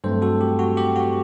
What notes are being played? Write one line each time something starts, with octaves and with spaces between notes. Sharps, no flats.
G2 F#3 A3 C4 A4 C5
F#4 A4
G4
F#4
G4
F#4